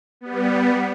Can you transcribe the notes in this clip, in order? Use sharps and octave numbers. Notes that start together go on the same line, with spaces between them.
G3 B3